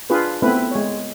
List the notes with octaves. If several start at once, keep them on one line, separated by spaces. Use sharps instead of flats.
D4 F4 G#4 B4
A3 B3 C4 E4 B4
G#3 C#5